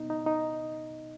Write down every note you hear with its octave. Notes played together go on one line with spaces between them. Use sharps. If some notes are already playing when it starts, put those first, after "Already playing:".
Already playing: B2 B3 D#4
D#4
D#4